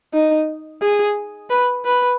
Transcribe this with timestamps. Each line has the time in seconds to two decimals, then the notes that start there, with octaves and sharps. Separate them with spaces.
0.13 D#4
0.82 G#4
1.50 B4
1.85 B4